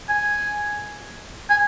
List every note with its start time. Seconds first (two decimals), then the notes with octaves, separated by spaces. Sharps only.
0.09 G#5
1.50 G#5